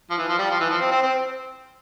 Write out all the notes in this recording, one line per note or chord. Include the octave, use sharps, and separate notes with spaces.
F3
E3
F3
G3
F3
E3
F3
C4
C4
C4